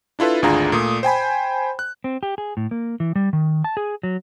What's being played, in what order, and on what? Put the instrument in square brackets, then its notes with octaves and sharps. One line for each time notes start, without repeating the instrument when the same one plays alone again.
[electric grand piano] D4 E4 F4 A4 B4
G#1 D2 D4 F4 G#4 A#5
A#2 A3 D#6
C5 G5 G#5 B5
F#6
[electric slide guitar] C4
G4
G#4
A2
A#3
E3
G3
D#3
A5
G#4
F#3